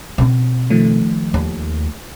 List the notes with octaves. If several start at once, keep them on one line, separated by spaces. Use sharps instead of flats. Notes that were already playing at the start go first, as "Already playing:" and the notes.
B2 C4
D#3 F3 A3
D#2